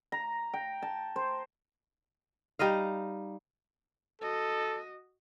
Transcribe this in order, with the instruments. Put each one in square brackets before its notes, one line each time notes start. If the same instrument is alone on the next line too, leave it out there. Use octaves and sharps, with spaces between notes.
[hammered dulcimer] A#5
G5
A5
C5
[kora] G3 D#4 D#5 F5
[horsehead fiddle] F#4 D#5 [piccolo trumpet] A4